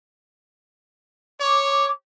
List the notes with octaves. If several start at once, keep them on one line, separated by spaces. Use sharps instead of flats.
C#5 D6